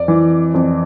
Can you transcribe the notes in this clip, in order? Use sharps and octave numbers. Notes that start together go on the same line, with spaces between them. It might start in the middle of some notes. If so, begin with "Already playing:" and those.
Already playing: F2 D5
E3
F2